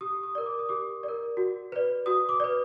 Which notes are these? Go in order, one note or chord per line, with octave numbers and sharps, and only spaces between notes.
G4 D#6
D#6
A#4 D5
D6
D#6
G4 D6
A#4 D5
F#4
B4 D5
F#4 D#6
D6
B4 D5